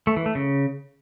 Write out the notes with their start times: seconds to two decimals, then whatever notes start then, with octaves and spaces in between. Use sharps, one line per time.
0.07 A3
0.16 E3
0.26 A3
0.35 C#3